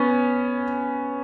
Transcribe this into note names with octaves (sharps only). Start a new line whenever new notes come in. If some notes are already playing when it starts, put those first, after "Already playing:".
Already playing: B3 C#4